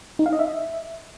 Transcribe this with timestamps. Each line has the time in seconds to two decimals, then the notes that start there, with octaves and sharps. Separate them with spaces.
0.19 D#4
0.26 F5
0.33 D#5
0.39 E5